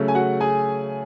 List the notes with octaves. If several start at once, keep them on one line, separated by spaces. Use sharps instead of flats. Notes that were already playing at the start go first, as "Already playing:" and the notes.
Already playing: C#3 F#3 A3 C#4
G#5
F#4 F#5
G#4 G#5